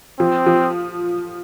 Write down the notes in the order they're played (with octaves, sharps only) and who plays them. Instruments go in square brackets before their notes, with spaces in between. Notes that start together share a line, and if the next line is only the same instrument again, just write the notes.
[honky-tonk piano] F3 [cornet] C4
[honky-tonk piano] F3